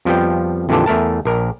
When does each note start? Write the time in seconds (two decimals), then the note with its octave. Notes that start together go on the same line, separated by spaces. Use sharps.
0.05 F2 F3 G3 B3 G5
0.69 F2 A#2 D3 E3 G4 A4
0.86 E2 A3 A#4 A5
1.25 A#1 A#4